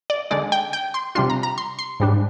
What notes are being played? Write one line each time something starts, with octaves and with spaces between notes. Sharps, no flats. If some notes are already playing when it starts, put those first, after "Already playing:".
D5
D3 G#3 D#4 D5
G5
G5
C6
C3 G3 D4 F4 C6
A#5
A#5
C6
C6
G#2 G3 D4